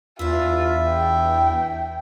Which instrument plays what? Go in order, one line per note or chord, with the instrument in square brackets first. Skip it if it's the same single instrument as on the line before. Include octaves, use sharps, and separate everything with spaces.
[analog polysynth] E2 [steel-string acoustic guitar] D4 E4 [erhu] F4 [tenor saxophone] E5
[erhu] G5